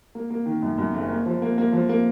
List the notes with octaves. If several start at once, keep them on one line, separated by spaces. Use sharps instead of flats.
A#3
A#3
D#3
F#2
F#2
F#1
A#3
F3
A#3
A#3
F3
A#3